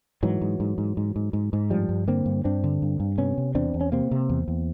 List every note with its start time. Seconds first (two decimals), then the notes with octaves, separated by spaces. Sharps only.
0.23 G#2 E3 F#3
0.42 G#2
0.60 G#2
0.78 G#2
0.97 G#2
1.16 G#2
1.33 G#2
1.53 G#2
1.70 G2 F3 G3
1.89 G2
2.08 D3 A#3 C4
2.26 G2
2.44 G2 C4 D4
2.64 D3
2.82 G2
3.00 G2
3.18 C3 B3 C#4
3.38 C3
3.55 E2 C4 D4
3.74 E2
3.81 C#4
3.92 C3 A#3 C4
4.11 C3
4.29 E2
4.48 E2